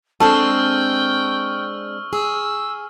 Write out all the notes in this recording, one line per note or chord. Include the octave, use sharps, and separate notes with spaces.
G#3 C4 D4 A4 G5 C#6 E6 F6
G#4 E6